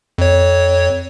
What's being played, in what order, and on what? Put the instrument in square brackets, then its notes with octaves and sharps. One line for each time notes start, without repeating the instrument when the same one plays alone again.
[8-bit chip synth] F2 C#5